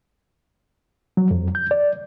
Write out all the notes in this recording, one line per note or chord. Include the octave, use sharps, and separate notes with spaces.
F#3
F2
G6
D5